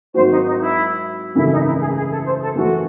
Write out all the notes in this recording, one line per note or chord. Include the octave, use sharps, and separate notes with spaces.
G#1 G#2 F#3 C4 F#4 C5
D#4
D#4
E4
G#1 F#2 C#3 E3 A3 E4
D#4
E4
G#4
G#4
A4
C5
A4
F#2 E3 A3 F#4